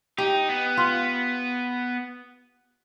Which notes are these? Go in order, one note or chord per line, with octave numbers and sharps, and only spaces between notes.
D#4 G4
B3
F4